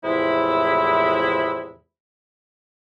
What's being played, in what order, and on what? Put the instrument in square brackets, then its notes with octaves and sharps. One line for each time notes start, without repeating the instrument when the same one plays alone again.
[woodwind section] E2 A2 C3 F3 G#3 E4